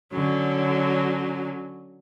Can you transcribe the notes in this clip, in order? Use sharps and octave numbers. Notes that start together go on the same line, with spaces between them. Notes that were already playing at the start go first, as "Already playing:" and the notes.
D3 F#3 C#4